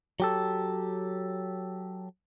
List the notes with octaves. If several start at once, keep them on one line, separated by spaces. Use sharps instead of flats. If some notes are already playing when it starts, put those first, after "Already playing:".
F#3 G4 A4